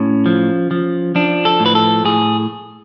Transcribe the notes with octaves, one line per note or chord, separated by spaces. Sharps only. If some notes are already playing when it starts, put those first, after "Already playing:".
Already playing: A2 C#4
F3
F3
F3 D4
A4
A2
B4
A4
A2 G#4